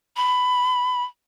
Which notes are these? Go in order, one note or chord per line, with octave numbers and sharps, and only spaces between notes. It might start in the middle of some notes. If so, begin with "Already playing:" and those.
B5